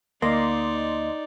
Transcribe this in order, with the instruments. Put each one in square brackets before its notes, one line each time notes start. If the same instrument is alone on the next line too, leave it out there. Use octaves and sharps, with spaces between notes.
[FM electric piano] D2 D#5 C6 [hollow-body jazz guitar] A#3 [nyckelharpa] D#4 D5